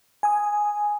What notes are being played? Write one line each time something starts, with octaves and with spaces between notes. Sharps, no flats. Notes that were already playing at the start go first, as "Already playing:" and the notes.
G#5 D#6